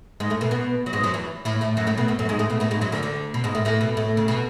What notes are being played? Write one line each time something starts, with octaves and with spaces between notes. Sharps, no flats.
G#2 G#3
A2 A3
B2 B3
B2 B3
F#3
G#2 G#3
F#2 F#3
E2 E3
A2 A3
A2 A3
F#2 F#3
A2 A3
B2 B3
A2 A3
F#2 F#3
G#2 G#3
A2 A3
B2 B3
A2 A3
G#2 G#3
F#2 F#3
D2 D3
D2 D3
B2
G#2 G#3
A2 A3
A2 A3
B2 B3
A2 A3
C#3
B2